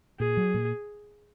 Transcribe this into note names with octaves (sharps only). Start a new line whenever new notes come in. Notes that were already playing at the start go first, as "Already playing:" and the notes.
A#2 G#4
F#3
A#2